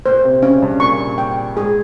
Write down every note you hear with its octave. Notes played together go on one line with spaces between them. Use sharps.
A#2 C5
C3
C#3 C#4
G2
A#2 C#6
G5
G#2 G#4